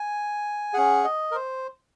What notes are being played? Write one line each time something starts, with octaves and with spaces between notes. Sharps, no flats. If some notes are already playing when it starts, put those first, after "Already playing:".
Already playing: G#5
C#4 G#4 F#5
D#5
A#4
C5